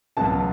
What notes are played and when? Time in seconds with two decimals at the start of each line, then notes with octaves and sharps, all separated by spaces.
0.17 C#2 B2 F#3 A5